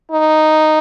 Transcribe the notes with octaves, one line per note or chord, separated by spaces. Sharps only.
D#4